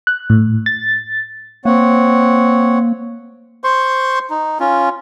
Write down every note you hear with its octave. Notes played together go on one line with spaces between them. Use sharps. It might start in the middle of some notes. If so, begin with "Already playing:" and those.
F#6
A2
A6
A#3 C4 C#5 F#5
C5 C6 C#6
D#4
C#4 F4